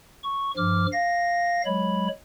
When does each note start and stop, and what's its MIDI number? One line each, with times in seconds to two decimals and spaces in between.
0.23 0.51 85
0.57 0.86 43
0.57 0.86 53
0.57 0.86 86
0.57 0.86 89
0.92 1.62 77
0.92 1.62 94
1.66 2.08 54
1.66 2.08 56
1.66 2.08 73
1.66 2.08 83